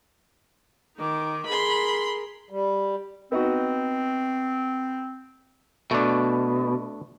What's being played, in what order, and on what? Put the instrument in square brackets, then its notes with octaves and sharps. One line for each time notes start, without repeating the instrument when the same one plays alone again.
[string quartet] D#3 [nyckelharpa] D#4 D6
[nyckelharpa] G#4 A#4 [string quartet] B5 C6
[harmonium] G3
[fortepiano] B3 D#4 F#4 [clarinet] C4
[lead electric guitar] B2 [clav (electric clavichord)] A3 D4